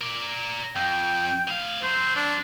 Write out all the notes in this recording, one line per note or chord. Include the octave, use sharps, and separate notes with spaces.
A#4 D5
F2 G5
A2 F5
F#3 C4 C5
D4